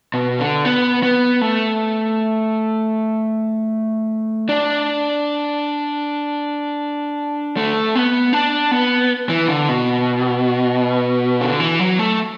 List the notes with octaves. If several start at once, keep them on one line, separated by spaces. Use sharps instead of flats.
B2
D3
B3
B3
A3
D4
A3
B3
D4
B3
E3
D3
B2
D3
E3
F#3
A3